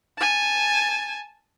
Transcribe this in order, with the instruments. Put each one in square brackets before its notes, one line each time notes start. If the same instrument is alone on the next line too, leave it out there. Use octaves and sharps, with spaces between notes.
[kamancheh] G#5 A5